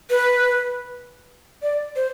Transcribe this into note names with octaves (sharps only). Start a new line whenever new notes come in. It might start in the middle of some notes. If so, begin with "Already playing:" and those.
B4
D5
C5